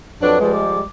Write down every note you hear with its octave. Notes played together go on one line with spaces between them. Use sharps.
F2 F#3 D4 B4
F3 G3 G#3
D6